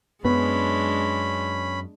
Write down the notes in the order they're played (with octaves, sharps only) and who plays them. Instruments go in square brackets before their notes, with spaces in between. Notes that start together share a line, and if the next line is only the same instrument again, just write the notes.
[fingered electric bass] F#2 [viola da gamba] G#3 D4 [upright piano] B3 [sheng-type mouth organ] C#4 B5